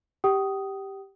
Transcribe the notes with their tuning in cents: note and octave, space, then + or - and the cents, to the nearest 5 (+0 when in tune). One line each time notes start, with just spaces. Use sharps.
G4 +0 G5 -40 D#6 +0